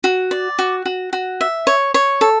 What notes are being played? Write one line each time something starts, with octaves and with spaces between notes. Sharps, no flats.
F#4
D5
F#4
F#4
F#4
E5
C#5
C#5
A4